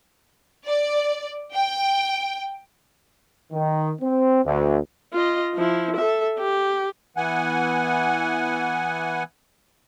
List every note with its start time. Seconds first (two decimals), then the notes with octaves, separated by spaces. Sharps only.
0.67 D5
1.54 G5
3.52 D#3
4.02 C4
4.45 D2
5.13 F4 D#5
5.55 F3 E4
5.96 A4 E5
6.38 G4
7.17 E3 B3 F#5 G#5